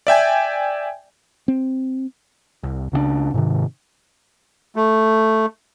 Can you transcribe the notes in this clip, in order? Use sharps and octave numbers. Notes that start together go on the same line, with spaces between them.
D5 E5 G5 G#5
C4
C2
C#2 C#3 F3 D4
G#2 C3 D#3
A3